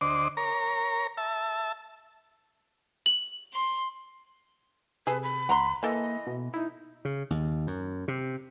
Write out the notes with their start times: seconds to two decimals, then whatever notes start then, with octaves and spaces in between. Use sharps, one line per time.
0.01 D2 C5 D5 D#5 D6
0.37 A#4 C#5 A#5
1.17 E5 A5
3.06 F#7
3.53 C6
5.07 C3 G#4 A4 B4
5.23 B5
5.49 C#2 F#5 A#5 C6
5.83 E3 A#3 A4 D#5
6.27 B2
6.54 D#4 E4
7.05 C#3
7.30 D#2
7.67 F#2
8.08 C3